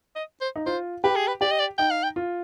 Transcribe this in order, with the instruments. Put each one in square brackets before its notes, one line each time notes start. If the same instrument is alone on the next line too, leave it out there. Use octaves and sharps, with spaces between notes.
[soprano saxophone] D#5
C5
[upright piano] D#4
[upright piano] F4 [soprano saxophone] C5
[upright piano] G4 [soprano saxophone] B4
[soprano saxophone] G#4
B4
[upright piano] G4 [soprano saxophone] D5
[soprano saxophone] D#5
D5
[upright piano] D#4 [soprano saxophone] G5
[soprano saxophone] F5
G5
[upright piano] F4